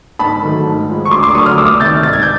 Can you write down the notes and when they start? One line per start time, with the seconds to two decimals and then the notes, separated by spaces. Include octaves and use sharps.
0.19 G#2 A5 B5
0.43 D#3 F#3 A3
0.66 G#2
0.89 F3 G#3
1.05 C#6
1.11 D2 C6 D6
1.23 C6 D6
1.34 D3 F#3 A3 C#6 D#6
1.46 D#6 F6
1.58 C2 D6 E6
1.80 C3 G6 A6
1.84 D#3
2.03 G#2 A6
2.13 G#6
2.23 G6